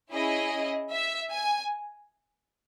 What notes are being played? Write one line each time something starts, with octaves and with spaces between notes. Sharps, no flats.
C#4 E4 G#4 D#5
E5
G#5